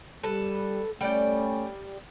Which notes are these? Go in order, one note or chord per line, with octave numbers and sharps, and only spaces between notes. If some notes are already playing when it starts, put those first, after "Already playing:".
G3 A4 B4
G3 A3 C#4 D5 G5